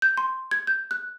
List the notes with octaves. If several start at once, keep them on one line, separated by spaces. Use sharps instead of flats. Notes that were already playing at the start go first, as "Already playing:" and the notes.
G6
C6
G#6
G6
F#6